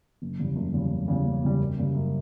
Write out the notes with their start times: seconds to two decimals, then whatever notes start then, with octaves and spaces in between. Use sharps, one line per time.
0.22 F#1
0.39 E2 C#3 G3
0.56 F#1
0.73 E2 C#3 G3
0.91 F#1
1.08 E2 C#3 G3
1.25 F#1
1.43 E2 C#3 G3
1.59 F#2
1.78 C#3 G3 A#3
1.94 F#2